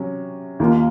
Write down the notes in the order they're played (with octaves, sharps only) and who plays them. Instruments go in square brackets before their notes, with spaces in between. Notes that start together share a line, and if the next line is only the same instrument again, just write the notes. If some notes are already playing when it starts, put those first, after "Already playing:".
Already playing: [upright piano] C3 F#3 C#4
D#2 D#3 A#3 F4